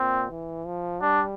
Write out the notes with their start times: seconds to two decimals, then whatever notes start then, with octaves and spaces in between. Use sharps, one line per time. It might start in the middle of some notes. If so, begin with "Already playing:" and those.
Already playing: A#2 C4
0.29 E3
0.66 F3
1.02 G3 D4